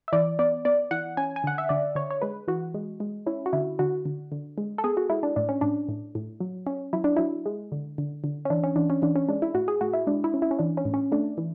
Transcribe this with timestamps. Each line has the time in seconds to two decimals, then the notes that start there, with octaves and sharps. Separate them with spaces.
0.08 E5
0.12 E3 D5
0.39 B3 D5
0.65 B3 D5
0.91 E3 F#5
1.17 C#4 G#5
1.36 G#5
1.44 D3 F#5
1.58 E5
1.69 D3 D5
1.95 D3 C#5
2.10 C#5
2.22 G#3 B4
2.48 E3 F#4
2.74 G#3
3.00 G#3
3.26 C#4 E4
3.46 F#4
3.53 D3 E4
3.79 D3 F#4
4.06 D3
4.32 D3
4.58 G#3
4.78 A4
4.84 B3 G#4
4.97 F#4
5.10 G#3 E4
5.23 D4
5.36 A2 D4
5.49 C#4
5.61 A2 D4
5.89 A2
6.15 A2
6.40 F#3
6.67 C#4
6.93 F#3 E4
7.04 D4
7.17 F#3 E4
7.46 G#3
7.72 D3
7.98 D3
8.24 D3
8.45 C#4
8.50 E3 D4
8.63 C#4
8.76 E3 D4
8.90 C#4
9.02 E3 D4
9.16 C#4
9.29 G#3 D4
9.42 E4
9.54 A2 F#4
9.68 G#4
9.81 A2 F#4
9.93 E4
10.07 G#3 D4
10.24 E4
10.34 C#4
10.42 E4
10.51 C#4
10.59 E3 D4
10.77 C#4
10.85 A2
10.94 C#4
11.12 A3 D4
11.38 E3